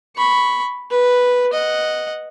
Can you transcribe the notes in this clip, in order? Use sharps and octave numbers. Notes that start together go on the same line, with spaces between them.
B5 C#6
B4
D#5 F#5